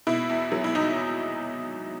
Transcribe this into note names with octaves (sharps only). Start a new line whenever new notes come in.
B2 E4
E2
F#3
E4
E2 D#4